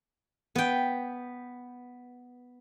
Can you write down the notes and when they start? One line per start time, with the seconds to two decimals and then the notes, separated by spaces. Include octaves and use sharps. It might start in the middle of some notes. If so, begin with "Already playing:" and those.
0.55 B3 G5